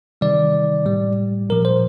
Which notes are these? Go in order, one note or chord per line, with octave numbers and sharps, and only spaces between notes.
C3 D#3 G3 D5
A2 G3
A#2 F3 A#4
C5